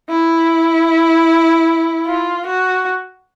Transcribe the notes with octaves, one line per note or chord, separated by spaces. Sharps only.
E4
F4
F#4